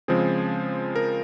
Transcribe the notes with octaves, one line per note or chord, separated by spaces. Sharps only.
C#3 F3 G#3 C4 G#4
A#4